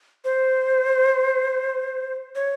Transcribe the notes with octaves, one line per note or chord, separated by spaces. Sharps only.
C5
C#5